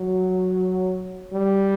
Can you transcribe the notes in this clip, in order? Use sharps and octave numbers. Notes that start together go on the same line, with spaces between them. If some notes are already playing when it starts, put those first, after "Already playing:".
Already playing: F#3
G3